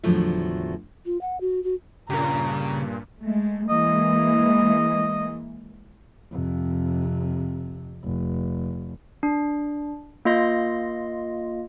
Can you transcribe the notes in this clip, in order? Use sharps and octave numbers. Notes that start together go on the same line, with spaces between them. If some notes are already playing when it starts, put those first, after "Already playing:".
E2 A2 D3 F3 F#3 A3
F4
F#5
F#4
F#4
G2 A#2 C#3 A#5
G#3 A3
E3 G#3 A#3 D#5
F2 C3
F1
D4
A#3 F4 D#5 C6 A#6